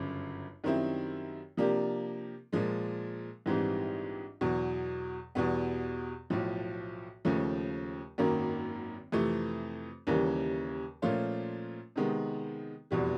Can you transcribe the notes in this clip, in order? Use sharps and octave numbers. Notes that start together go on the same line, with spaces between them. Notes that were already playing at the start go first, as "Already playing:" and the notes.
Already playing: G1 F#2 C#3
F#2 D#3 G3 C4 E4
C3 F3 A#3 D4 G4
A#2 F3 G#3
A#1 G#2 E3 G3 C4
E2 B2 F#3
E2 B2 G3 B3
B1 A2 F3
D#2 C#3 F3 A3
G#1 F#2 D#3 F#3 A#3
F2 C3 E3 A3
D#2 C#3 E3 G3 A#3
A#2 F3 A3 C#4 F4
C3 D#3 G#3 B3
F1 E2 B2 G3